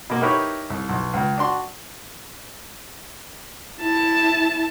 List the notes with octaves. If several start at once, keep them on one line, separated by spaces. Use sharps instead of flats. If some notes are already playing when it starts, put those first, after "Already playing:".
B2 A#3
D#4 E4 G4 A#4 B4 C#5
C2
B1
C#2
D4 F#4 C6
E4 A5